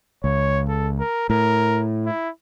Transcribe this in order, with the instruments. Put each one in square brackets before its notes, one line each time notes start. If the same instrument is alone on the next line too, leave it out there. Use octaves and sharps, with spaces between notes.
[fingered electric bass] C#2 [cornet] C#5
[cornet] A4
A#4
[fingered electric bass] A2 [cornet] A#4
[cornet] E4